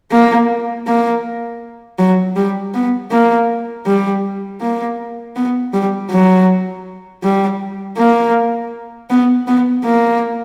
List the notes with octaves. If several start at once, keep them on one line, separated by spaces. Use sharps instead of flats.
A#3
A#3
F#3
G3
B3
A#3
G3
A#3
B3
G3
F#3
G3
A#3
B3
B3
A#3